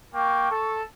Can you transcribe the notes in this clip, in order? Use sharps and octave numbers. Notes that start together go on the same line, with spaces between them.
A#3 G5 C#6
A4